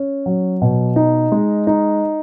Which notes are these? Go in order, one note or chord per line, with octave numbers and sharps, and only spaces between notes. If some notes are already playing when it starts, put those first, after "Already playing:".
Already playing: C#4
F#3
B2
D#4
G#3
D#4